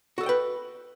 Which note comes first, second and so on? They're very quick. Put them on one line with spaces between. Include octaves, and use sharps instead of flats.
F#4 A4 D#5 G5 B4